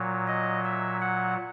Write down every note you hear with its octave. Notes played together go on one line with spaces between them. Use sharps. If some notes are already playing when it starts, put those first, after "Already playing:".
Already playing: A#2 F#3
D#5
E5
F#5